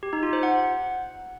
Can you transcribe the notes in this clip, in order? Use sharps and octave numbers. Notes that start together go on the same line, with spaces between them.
G4
D#4
F4
C5
F#5